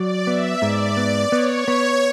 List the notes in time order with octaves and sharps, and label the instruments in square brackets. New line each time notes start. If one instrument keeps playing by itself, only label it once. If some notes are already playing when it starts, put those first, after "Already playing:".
Already playing: [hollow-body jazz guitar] F#3 [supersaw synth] D5
[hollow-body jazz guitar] B3 [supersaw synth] E5
[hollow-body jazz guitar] G#2 [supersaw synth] D5
[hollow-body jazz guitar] B3
[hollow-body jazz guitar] B3 [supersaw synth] C#5
[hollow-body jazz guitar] B3